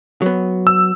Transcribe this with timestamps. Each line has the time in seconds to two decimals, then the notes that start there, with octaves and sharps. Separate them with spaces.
0.22 F#3 B3
0.67 E6